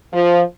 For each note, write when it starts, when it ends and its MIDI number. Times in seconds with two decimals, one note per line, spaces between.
0.13 0.41 53